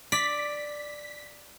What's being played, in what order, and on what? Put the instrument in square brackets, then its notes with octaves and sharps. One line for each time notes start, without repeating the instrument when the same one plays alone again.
[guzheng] D5 [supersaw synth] B6